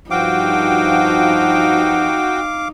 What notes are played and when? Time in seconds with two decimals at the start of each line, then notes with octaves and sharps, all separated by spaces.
0.11 G2 F3 D#4 F#4 F5 G5 D6